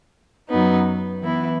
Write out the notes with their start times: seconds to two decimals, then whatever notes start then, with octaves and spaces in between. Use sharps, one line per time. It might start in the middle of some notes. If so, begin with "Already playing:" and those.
0.49 F#2 F#3 B3 D#4
1.21 E3 B3 E4 B4